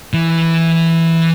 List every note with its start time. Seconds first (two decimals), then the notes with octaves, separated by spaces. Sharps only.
0.14 E3